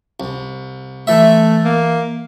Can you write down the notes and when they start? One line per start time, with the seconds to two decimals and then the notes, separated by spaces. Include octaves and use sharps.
0.20 C2
1.07 E3 A3 E5
1.65 A#3